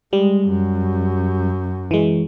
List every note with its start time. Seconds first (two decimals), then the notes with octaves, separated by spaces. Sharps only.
0.13 G3 G#3
0.48 F#2
1.91 E3 G#3